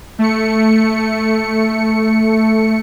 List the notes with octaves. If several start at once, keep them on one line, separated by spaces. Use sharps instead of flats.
A3 C#7